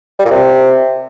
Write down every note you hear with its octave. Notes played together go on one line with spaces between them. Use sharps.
G3
A#2
C3